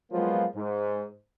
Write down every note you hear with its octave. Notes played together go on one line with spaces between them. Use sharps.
F3 F#3 G#3 A#3 B3 F4
G#2